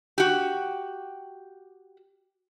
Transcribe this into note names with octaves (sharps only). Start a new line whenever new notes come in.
F#4 G4